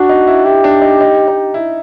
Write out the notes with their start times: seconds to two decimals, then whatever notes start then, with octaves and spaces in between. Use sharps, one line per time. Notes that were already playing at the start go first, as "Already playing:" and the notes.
Already playing: D4 F#4
0.09 D#4
0.27 E4
0.45 E4 G4
0.64 D4
0.82 D#4
1.01 D#4
1.28 D#4
1.54 E4